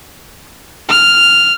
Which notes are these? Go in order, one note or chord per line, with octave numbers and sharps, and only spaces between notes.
F6